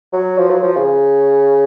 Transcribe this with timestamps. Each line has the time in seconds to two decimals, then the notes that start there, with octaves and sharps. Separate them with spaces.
0.13 F#3
0.38 F3
0.50 F#3
0.63 F3
0.76 C#3